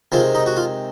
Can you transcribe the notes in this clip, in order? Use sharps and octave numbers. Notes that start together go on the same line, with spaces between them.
C3 D#3 G#3 C4 F4
D#4
F#4
F4